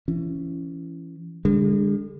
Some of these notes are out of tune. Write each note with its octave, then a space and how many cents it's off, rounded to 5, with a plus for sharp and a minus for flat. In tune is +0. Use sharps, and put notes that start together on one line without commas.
E3 +25 C#4 +0
D3 +0 G#3 -40